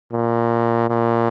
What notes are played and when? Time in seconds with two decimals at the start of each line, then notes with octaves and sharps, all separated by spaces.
0.12 A#2
0.89 A#2